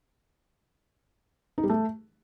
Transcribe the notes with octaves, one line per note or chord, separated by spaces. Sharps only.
D#4
G3
A3